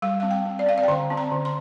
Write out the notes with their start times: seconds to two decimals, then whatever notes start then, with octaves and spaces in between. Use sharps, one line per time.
0.02 G3 F5
0.20 C4 F5
0.31 G5
0.45 C4
0.59 D5
0.66 C4 F5
0.78 D5
0.83 G5
0.88 D3 A#5
1.10 C4
1.17 A#5
1.32 D3
1.45 C6